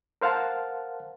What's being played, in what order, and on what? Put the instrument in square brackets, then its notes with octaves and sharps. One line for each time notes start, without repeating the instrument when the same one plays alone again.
[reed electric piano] A#4 C5 F5 F#5 A5